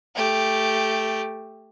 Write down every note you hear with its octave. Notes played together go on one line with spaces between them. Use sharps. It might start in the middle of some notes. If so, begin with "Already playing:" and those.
A3 G4